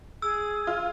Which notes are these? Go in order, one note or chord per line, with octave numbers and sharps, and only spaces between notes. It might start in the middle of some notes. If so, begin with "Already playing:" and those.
G#4 E6
F4